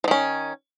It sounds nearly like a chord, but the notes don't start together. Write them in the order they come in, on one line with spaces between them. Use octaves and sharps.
F3 D#3 C#4